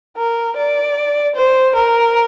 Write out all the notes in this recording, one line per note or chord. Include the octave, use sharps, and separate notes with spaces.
A#4
D5
C5
A#4